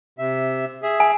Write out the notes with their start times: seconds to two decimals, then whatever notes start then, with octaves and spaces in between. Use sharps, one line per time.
0.19 C3 E5
0.83 G#4 E5
1.00 G#5